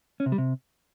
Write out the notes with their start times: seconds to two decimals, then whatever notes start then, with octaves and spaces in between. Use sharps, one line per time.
0.20 C#4
0.26 C3
0.32 G3
0.38 C3